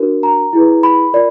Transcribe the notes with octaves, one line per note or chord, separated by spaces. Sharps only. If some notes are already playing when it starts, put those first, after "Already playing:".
Already playing: D4 F#4 A#4
A#5
E4 G#4 B4
B5
F4 A#4 D5